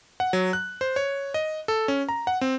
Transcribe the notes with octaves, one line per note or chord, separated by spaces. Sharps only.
F#5
F#3
F#6
C5
C#5
D#5
A4
C#4
A#5
F#5
C4